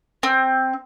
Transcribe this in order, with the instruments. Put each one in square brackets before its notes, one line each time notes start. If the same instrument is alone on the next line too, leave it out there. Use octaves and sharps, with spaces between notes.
[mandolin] C4